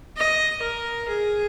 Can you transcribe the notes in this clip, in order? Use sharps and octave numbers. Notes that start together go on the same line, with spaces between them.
D#5
A#4
G#4